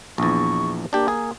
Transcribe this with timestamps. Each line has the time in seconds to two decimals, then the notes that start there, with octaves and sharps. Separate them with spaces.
0.18 A#1 E2 C#6
0.93 A#3 D4 G4
1.08 G#4